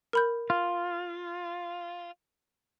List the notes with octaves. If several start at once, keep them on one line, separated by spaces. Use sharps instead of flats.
A#4 B5 G6
F4